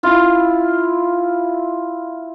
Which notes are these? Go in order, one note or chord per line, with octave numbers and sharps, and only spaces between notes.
E4 F4